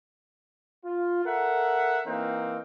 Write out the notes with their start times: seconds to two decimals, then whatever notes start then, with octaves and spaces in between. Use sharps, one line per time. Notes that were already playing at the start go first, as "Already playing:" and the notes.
0.85 F4
1.25 A4 A#4 E5 F#5
2.07 E3 A#3 C4 D#4 F5